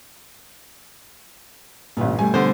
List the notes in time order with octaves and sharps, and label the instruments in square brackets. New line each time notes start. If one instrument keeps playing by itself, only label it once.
[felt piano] A1 G2 [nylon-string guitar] A#2 D3 B3
[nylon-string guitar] B2 G3 A3 [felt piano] G#5
[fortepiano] D3 C5 [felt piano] B3